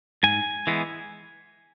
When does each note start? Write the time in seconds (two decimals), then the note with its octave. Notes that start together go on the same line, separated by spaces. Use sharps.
0.23 G#2 G#5
0.67 E3 G#3 B3